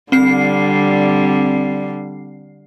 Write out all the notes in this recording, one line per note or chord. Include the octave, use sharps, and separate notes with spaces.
D3 G3 C4 C7